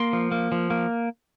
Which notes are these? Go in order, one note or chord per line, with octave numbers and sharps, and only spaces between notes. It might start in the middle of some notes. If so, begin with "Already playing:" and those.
Already playing: A#3 C6
F3
A#3
F3
A#3